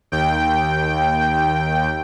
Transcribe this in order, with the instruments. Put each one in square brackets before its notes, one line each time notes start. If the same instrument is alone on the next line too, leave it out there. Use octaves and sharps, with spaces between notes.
[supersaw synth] D#2 G5